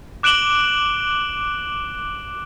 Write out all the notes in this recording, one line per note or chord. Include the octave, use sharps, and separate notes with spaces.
D6 F#6 D7 E7 F#7 G7